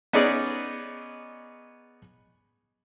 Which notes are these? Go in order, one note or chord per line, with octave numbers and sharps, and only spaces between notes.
B3 C#4 D#4 G#4 D5